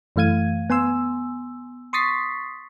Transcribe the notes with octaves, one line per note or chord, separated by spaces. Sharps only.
F#2 E3 A3 F5 G#6 D#7
B3 G#5 C6 E6
C6 C#6 D#6 A6 B6 C7